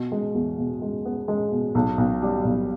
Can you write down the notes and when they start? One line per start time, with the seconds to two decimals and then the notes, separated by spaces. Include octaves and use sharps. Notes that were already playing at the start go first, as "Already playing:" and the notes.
Already playing: B2
0.12 G#3
0.35 E2
0.58 B2
0.82 G#3
1.05 B3
1.28 G#3
1.52 B2
1.75 B1
1.98 B1
2.22 G3
2.45 B1